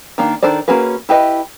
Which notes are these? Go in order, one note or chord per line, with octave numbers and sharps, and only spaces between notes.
D#3 A#3 D4
D#3 D4 A4 C5 D5
A#3 C#4 F#4 G#4 B4
E4 G4 B4 D#5